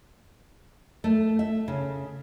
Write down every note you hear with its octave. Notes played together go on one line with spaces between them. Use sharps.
A3
E5
C#3